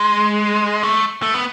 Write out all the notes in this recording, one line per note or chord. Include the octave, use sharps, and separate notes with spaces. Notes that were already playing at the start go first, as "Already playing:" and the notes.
Already playing: G#3
A3
A3
B3